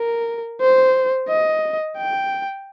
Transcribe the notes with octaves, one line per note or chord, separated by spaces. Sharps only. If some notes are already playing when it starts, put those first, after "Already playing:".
Already playing: A#4
C5
D#5
G5